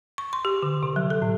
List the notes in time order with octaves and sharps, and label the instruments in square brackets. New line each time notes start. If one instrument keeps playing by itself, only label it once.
[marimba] C#6
C6
G4
D3
C3
F#3
A4
A2